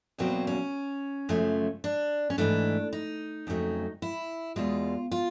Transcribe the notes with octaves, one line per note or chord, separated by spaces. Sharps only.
E2 B2 F#3 A#3 C4
C#4
F#2 C#3 F3 A3
D4
C#4
G#2 E3 A3 D4
D#4
F2 C#3 F#3 A3
E4
E2 B2 G#3 F4
F4